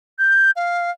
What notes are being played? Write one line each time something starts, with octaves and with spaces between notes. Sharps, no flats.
G6
F5